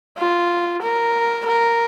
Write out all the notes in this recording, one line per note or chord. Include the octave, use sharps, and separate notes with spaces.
F4
A#4
A#4